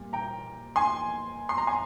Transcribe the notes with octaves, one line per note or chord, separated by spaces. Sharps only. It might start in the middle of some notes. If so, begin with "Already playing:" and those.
Already playing: A#2 G3
G5 A#5
G#5 C6
C6
A#5
G#5 C6